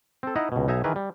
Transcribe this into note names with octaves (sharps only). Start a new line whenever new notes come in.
C4 A4
D#4 E4 D#5 F#5 A#5
C#2 B2
B1 D#4 E5 G#5 A#5
D#3 E3 G#4 A#4 B4
G3